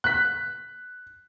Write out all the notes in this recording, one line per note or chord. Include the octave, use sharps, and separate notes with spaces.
F#6 B6